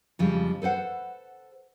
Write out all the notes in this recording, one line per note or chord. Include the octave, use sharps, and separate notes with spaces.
F2 C#3 F3 G3 G#3
A4 B4 C5 F#5